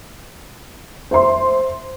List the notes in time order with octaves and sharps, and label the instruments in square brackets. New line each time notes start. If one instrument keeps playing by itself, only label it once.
[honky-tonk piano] C5 E5 C6